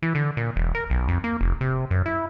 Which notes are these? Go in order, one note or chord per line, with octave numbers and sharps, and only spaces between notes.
E3
D3
A#2
E1
A#4
B1
F2
A#3
F1
C3
F#2
E4